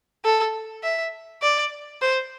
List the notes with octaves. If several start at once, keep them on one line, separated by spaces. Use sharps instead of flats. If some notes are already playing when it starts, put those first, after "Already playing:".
A4
E5
D5
C5